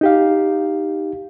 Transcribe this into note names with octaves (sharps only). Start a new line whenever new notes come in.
D#4 G4 F5